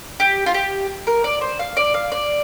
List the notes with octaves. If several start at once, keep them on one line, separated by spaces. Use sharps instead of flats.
G4
F4
G4
A#4
D5
C5
F5
D5
F5
D5